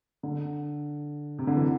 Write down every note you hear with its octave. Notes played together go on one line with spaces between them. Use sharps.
D3
C3
D3
E3